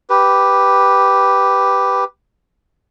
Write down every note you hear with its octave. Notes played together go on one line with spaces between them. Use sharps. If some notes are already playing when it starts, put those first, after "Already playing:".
G4 B4